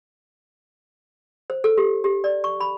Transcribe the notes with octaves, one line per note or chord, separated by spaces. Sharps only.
C5
A4
G4
G4
D5
C#6
B5